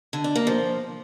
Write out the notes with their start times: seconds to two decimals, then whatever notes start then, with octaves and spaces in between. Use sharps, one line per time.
0.13 D3
0.24 D4
0.36 A#3
0.47 F3